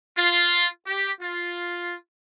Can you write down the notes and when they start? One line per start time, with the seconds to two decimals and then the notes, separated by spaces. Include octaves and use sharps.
0.17 F4
0.86 G4
1.21 F4